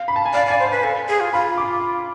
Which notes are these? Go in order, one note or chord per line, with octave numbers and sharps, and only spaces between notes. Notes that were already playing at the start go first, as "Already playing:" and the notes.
Already playing: F5
B5
A5
G#5
D5 F5
D5
G#5
C5
F5
B4
A4 G#5
G#4
F4
F4 B5
D6